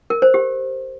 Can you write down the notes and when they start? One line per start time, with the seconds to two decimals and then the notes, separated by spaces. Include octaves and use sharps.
0.10 A#4
0.22 C5
0.34 G4